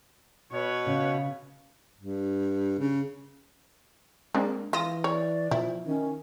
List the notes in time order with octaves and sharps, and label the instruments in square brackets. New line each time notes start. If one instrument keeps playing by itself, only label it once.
[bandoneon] B2 [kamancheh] B4 C#5
[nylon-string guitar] C#3
[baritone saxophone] G2
C#3
[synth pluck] G#3 C4 D4 [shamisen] A#3
[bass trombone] E3 [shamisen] F4 [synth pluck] D#6 A#6
[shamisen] C#5 [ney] D5
[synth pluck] B2 [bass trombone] F3 [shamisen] E4
[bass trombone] D#3 [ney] C#4